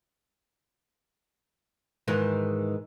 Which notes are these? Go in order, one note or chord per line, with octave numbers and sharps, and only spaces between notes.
G#2 D#3 E3